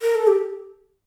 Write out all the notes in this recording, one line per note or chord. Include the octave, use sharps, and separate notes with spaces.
A#4
A4
G4